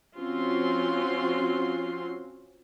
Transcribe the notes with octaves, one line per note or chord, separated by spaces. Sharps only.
F3 C4 C#4 F4 F#4 C6